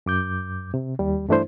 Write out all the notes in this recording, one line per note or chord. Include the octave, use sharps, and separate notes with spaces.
F#2 D6 G6
C3
D#2 G3
G2 E3 A3 D4 E4 C5